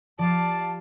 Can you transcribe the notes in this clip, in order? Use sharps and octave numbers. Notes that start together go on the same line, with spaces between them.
F3 G4 D5 F5 A5 B5